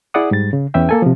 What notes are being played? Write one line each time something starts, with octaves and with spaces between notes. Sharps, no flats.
E4 G#4 D5 F#5 D#6
G#2 G3 A6
C#3
E2 C#4 B4 E5 G5
A#3 A4 G#5
C3 F3